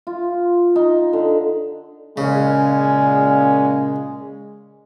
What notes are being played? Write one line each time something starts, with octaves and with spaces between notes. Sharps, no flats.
F4
D#4
D3
A#2 C#3 G#3 C#4